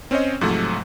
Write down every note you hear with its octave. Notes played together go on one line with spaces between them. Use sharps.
C4 C#4 C5 C#5 D#5
G#2 C3 F3 F#3 A3